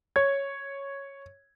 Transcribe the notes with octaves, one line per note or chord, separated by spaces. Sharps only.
C#5 G#6